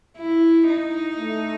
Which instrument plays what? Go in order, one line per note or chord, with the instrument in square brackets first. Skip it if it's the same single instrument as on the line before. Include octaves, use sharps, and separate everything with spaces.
[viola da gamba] E4
D#4
[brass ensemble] A3